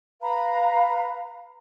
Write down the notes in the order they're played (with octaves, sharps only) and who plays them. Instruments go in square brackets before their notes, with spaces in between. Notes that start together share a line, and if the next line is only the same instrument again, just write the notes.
[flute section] B4 F5 A#5 B5